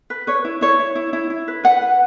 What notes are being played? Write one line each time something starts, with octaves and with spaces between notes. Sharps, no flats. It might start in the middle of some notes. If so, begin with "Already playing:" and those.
B4
B4 C#5
E4
E4 C#5
E4
E4
E4
E4
B4
B4 F#5
B4